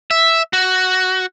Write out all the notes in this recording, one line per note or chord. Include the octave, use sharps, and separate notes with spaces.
E5
F#4